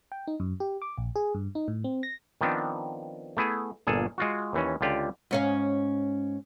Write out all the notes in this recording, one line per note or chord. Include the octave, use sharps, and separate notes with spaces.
G5
D#4
F#2
G4
D6
A#1
G#4
G2
D#4
A2
C4
A#6
D#3 F3 B3 C4 D4
A3 B3 E4 G#4
G1 A#2 G#4 A4
G#3 F4 F#4
D#2 E3 C#4
C#2 D3 F4 G4 D5
G#2 C#4 F5